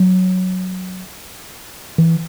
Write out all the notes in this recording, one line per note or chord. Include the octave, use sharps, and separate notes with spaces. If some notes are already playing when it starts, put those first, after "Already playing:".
Already playing: F#3
E3